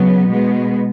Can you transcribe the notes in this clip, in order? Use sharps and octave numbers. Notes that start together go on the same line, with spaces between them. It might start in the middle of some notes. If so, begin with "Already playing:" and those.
Already playing: C#3 F#3 B3
B2 G#3 B3